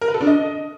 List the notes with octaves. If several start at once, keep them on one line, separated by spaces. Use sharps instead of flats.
A#4
B4
A4
D4
D#5